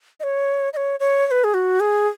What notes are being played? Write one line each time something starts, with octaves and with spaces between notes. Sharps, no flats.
D#5
C#5
D#5
C#5
C#5
C#5
B4
G#4
F#4
G#4